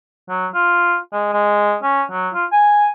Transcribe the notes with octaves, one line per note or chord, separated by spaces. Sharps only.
F#3
F4
G#3
G#3
C#4
F#3
F4
G#5